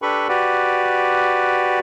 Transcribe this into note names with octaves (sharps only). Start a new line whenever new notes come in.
D4 G4 A4 B4 B5 C#6
F#4 G4 B4 D5